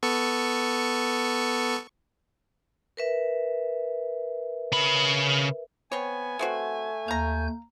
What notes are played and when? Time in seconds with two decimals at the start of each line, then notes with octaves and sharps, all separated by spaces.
0.03 B3 A4 C#6
2.97 A#4 B4 E5
4.72 C#3 B5
5.92 B3 C4 C#5 G#5
6.39 A3 B3 C4 F#4
7.08 D#2 F5 A#5 G6